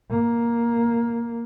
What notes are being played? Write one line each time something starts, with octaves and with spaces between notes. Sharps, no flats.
A#3